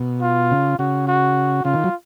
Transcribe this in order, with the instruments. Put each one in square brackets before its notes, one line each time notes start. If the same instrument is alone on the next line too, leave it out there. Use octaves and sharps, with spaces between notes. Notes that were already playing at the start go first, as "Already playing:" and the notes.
Already playing: [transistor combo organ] B2
[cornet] F4
[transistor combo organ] C#3
[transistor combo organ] C#3 [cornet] F#4
[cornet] F#4
[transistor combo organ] C#3 [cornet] F4
[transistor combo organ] D#3
F#3